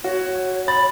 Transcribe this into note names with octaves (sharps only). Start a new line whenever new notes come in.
F#4 C#5
B5 A6